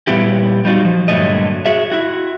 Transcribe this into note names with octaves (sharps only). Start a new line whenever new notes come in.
A#2 G3 B3 E4 G4
G3 D#4 F4 F#4
F3
G2 A#2 D3 F#3 A3 D#5
F#4 G#4 E5
E4 F#4